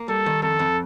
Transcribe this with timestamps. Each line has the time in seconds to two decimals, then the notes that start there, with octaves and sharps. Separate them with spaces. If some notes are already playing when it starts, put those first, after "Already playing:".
Already playing: A#3
0.08 G3 A4
0.26 D#3
0.42 F2 A4
0.59 F2